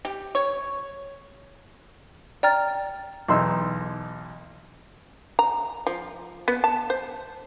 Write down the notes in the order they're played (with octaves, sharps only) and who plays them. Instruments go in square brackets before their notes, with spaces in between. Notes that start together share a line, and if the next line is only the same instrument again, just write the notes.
[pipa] G4
C#5
[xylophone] D5 G5 A#5 F6 A6
[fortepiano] B1 E2 D#4 C6 E6
[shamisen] A#5
F3
B3
A5
C5